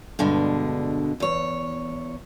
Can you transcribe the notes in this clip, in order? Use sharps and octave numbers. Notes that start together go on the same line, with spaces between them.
G2 B2 D3 G#3
E2 C#5